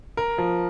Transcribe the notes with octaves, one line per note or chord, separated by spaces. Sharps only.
A#4
F3